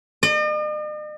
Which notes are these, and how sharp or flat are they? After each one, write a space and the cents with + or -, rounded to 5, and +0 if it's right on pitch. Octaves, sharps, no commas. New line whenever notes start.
D#5 -45